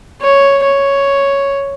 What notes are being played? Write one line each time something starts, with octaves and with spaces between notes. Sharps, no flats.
C#5
C#5